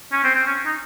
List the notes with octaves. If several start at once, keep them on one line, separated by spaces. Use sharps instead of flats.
C#4
C4
C4
C#4
D#4